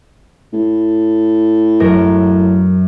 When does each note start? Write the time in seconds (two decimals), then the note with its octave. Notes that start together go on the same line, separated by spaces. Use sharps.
0.53 A2
1.80 F#2 A#4